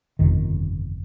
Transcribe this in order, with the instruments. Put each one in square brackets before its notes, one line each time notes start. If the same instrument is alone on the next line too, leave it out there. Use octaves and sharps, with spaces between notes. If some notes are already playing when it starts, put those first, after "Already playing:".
[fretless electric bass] G1 F2 C3 D#3